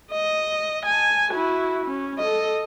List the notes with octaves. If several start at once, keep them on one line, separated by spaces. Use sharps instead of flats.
D#5
G#5 A5
E4 F#4
C#4
A4 D#5